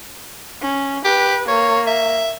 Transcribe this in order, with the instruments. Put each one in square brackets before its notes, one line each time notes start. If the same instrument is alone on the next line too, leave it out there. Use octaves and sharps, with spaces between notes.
[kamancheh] C#4
[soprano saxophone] G4 [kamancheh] B4
[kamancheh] A#3 [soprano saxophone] C#5
[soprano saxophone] E5